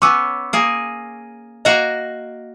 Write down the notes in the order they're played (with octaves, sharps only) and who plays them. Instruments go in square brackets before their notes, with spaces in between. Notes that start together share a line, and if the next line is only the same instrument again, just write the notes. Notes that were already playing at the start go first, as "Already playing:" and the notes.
[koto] B3 C#4 [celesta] C#6 D6 E6
[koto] A#3 G#4
[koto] A#3 F#4 A#5 [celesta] D#5